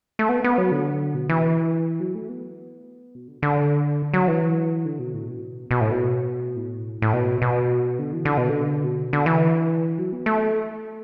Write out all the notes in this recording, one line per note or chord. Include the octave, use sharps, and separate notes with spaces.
A3
B3
B3
F#3
D3
B2
E3
F#3
A3
B3
B2
D3
D3
F#3
E3
D3
B2
A2
B2
B2
A2
B2
A2
A2
B2
B2
D3
E3
D3
B2
D3
B2
D3
E3
F#3
B3
A3